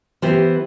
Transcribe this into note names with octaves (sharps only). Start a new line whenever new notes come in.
E3 B3 E4 G4 C5